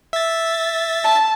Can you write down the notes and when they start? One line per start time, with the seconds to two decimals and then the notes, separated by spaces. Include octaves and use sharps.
0.13 E5 A6
1.04 A5